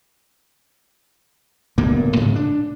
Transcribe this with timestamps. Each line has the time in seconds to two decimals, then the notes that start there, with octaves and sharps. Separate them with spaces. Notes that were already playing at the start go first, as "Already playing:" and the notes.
1.78 D1 G2 B2 A#3
2.17 G#2 C#3
2.35 D4